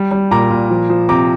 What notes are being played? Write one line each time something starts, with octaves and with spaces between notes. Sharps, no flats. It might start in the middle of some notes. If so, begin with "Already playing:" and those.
Already playing: G3
G3
A#2 A#5 D6
A#2
F3
F3
C3 A#5 D6